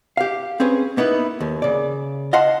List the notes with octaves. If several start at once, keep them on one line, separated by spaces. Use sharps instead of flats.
G4 F5
C4 C#4 G#4 B4
A#3 B3 D#4 E4 B4
D#2
C#3 D5
D#5 F5 F#5 A5 C6